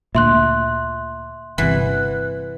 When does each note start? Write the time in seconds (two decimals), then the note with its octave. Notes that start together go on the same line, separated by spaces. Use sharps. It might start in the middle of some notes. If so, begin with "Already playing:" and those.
0.15 D2 A#2 E5 C6 F#6
1.58 G1 C3 E3 F#5